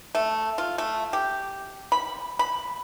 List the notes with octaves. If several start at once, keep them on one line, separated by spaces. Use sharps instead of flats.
A3
F4
A3
G4
B5
B5